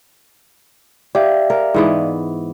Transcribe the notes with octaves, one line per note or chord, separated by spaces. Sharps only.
G4 D5 E5 F5
A#4
G#2 E3 B3